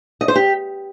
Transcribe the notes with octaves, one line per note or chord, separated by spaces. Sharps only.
D#5
C5
G4